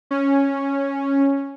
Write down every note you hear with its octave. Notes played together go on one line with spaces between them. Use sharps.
C#4